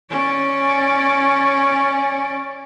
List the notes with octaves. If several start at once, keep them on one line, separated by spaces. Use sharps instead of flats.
C#4 D5